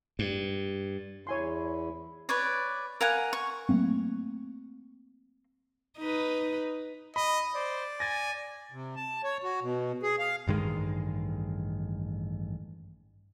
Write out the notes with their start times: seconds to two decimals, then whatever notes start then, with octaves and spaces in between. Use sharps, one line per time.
0.19 G2
1.27 E2 E4 C#5 G#5 C6
2.29 B4 C#5 D5
3.01 A#4 F5 F#5 G#5
3.33 C#6
3.69 F#3 A3 A#3 C4
5.99 D#4 B4
7.16 D#5 B5
7.55 C5 D5
8.00 G#5 A6 A#6
8.72 C3
8.96 A5
9.24 C#5
9.43 F#4
9.62 B2
10.02 G#4
10.19 F5
10.47 A1 G2 D#3 G#3